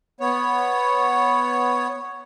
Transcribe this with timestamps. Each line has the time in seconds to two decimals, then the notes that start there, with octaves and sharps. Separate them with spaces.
0.20 B3 C#5